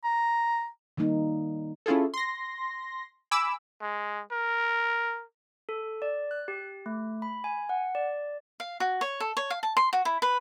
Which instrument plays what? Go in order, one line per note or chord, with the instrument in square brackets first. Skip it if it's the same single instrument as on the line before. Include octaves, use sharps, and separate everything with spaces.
[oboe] A#5
[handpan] D#3 G3 A#3 D#4
[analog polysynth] C#4 E4 F4 G#4 A4
C6 A#6
G#5 B5 D6 E6
[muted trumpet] G#3
A#4
[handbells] A4
D5
F#6
G4
A3
B5
G#5
F#5
D5
[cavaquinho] F5
F#4
C#5
A4
C#5
F5
A5
C6
F#4
E4
B4